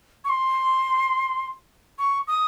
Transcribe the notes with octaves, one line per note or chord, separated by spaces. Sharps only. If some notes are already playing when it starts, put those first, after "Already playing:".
C#6
C6
C#6
D#6